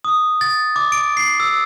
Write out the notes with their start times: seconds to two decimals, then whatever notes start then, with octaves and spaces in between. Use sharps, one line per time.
0.04 D#6
0.41 A6
0.76 D6
0.92 D7
1.17 C7
1.40 E6